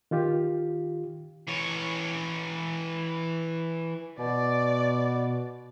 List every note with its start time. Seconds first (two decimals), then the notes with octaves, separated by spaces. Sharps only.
0.11 D#3 F4 G4
1.48 E3 C#5
4.19 B2 D5